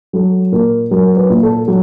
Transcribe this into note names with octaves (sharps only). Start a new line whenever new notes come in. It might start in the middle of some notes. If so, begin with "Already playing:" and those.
F#3 A4
A#2 A#4
F#3 A#4
B4
A#2
A4
F#3